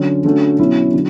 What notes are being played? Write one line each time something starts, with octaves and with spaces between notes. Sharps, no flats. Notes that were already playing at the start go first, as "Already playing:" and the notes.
Already playing: D3 F#3 C#4
D3 A3 C#4 F#4
B2 F#3 C#4 E4
D3 F#3